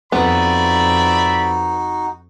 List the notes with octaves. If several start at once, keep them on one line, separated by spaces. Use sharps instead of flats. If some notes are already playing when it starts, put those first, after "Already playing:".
F2 B3 D#4 F#4 D5 E5 B5